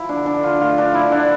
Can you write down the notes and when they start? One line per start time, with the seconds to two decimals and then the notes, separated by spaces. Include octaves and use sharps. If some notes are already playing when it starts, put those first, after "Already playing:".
Already playing: F3 E4
0.09 D4
0.15 D3
0.26 D4
0.37 D3
0.43 F4
0.60 A3 F4
0.78 D4
0.83 F3
0.94 E4
1.07 D3
1.12 D4